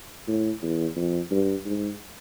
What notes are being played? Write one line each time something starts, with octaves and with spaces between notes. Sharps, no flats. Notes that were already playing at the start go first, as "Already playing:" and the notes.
A2
E2
F2
G2
G#2